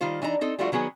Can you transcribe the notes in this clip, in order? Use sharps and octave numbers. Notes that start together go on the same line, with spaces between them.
D#3 G3 F4 C5
E3 D4 D#4 A#5
C4 D#4 A4
F3 G3 A3 D4 F4 F#4
D#3 F#3 B3 G#4